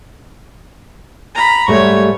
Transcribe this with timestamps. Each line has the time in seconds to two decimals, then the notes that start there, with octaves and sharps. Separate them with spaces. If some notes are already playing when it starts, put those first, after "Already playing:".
1.35 A#5 B5
1.68 G#2 G3 A3 C#5 C#6